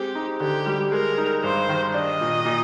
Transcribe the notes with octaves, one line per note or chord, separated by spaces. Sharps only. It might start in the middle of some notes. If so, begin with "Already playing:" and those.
Already playing: G#3 C4 G4
D#4
D3 G4
G3
G#3 A#4
D#4
G2 C5
D#3
D4 D#5
A#2
A#2